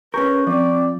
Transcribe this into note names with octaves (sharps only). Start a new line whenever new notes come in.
C#4 G#4 A#4 B4 C#6 G6
F3 C4 D5